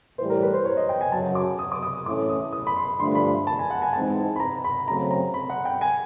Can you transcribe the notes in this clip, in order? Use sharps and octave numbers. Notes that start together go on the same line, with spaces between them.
A2 E3 G3 C5
A#4
B4
C5
C#5
D#5
G5
G#5
F#2 C#3 F#3 A5
D6
D#6
D6
D#6
A2 E3 A3 C#4 E4 D6
D#6
D#6
B5
C6
G2 D3 F3 A3 D4 C6
B5
A5
G#5
F#5
G#5
G#2 E3 G#3 C4 D#4 A5
B5
A#5
B5
C#3 F#3 A3 C4 A#5
A#5
B5
F#5
G5
G#5